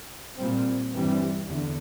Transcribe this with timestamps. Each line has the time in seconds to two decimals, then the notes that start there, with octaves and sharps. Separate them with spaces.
0.36 A#2 G3 C4
0.92 G2 E3 G3 C4
1.49 E2 D3